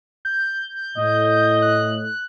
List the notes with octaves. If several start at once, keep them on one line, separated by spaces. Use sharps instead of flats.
G6
A2 D#5
F#6